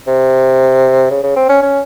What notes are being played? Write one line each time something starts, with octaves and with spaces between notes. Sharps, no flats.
C3
C#3
C#3
C4
C#4
C#4